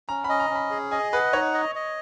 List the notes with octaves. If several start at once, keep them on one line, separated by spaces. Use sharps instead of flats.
C#4 A#5
D#5 B5
A#5
C#4
B5
G#4
D#5 G#5
B4 F#5
D#4 C#5
D#5
D#5